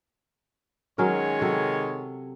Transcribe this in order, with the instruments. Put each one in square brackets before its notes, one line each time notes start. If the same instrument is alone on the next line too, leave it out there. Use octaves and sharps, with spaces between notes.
[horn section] D#3 G#3 C#5 [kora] F#3 C#4 A#4
[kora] C3 F#3 A4